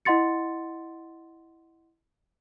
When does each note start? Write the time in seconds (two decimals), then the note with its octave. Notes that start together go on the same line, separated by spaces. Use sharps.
0.05 E4 D#5 F#5 C6 A6 C#7